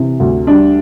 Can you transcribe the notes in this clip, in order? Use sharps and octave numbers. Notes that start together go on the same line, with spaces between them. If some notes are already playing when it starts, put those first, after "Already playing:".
Already playing: C3 E3
D2
G3 D4